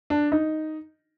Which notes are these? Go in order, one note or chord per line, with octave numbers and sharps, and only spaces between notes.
D4
D#4